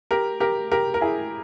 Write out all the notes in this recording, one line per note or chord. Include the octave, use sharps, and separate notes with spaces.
G4 A#4
G4 A#4
G4 A#4
A#4
E4 G#4